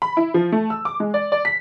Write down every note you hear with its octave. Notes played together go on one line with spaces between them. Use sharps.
B5
E4
F3
A3
E6
D6
G#3
D5
D5
B6